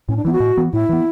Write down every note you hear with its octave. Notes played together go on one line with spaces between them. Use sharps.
A2 C#4
D4
E3 B3 E4
F#4
A2
E3 B3
A2 E4
E3 B3